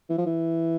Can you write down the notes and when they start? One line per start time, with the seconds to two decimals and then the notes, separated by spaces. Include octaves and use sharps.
0.10 E3
0.18 F3
0.26 E3